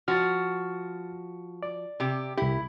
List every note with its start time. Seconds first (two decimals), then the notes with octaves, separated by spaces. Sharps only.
0.08 F3 F#4 F6 A6
1.63 D5
2.00 C3 G4
2.37 C2 E4 G4